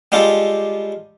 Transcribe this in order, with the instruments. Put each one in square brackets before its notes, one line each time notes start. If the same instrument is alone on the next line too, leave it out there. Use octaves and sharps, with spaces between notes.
[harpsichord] G3 G#3 F4 G4 A4